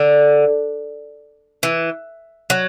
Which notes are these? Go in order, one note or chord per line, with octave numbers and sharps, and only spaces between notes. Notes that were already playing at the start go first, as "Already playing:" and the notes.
Already playing: D3
E3
F#3